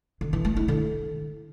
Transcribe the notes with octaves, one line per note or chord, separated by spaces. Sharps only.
D3
E3
A3
E4
D3